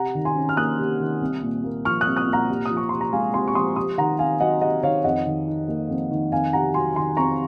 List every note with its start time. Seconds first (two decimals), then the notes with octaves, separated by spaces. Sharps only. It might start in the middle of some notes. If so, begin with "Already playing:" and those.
Already playing: C3 F#5 A#5
0.15 D#3
0.25 G#5 C6
0.36 C#4
0.49 F6
0.57 A#3 D#6 F#6
0.78 C3
1.00 D#3
1.21 C2
1.43 A#2
1.64 A#3
1.85 F3 C#6 F6
2.01 D#6 F#6
2.06 C2
2.16 D#6 F#6
2.27 A#2
2.33 F#5 A#5
2.49 C3
2.65 F3 D#6
2.77 C#6
2.89 C3 C6
3.01 A#5
3.13 G#3 F5 G#5
3.34 C3 G#5 C6
3.48 C#6
3.55 F3 C6 D#6
3.76 C3 C6 D#6
3.98 D#3 F#5 A#5
4.19 C4 F5 G#5
4.40 F#3 D#5 F#5
4.62 C3 D#5 F#5
4.83 D#3 C#5 F5
5.04 F2 D#5 F#5
5.26 D#3
5.47 D#4
5.68 A#3
5.89 F2
6.11 D#3
6.32 F2 F5 G#5
6.53 C3 F#5 A#5
6.74 F#3 G#5 C6
6.96 D#3 G#5 C6
7.17 F2 A#5 C#6